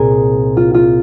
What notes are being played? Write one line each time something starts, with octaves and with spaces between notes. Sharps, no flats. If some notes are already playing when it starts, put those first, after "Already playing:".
Already playing: C2 A#2 G#4 A#4
F4
F4